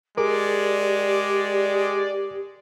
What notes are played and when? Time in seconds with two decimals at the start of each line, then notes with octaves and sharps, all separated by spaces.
0.18 G#3 G4 G#4 A#4 D5